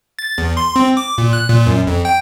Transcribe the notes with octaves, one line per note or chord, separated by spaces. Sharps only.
A6
E2
C6
C4
D6
A#2
F#6
A#2
F#2
F2
G5